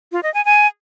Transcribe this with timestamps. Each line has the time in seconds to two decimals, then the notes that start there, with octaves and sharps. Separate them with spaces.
0.12 F4
0.23 D#5
0.34 G#5
0.45 G#5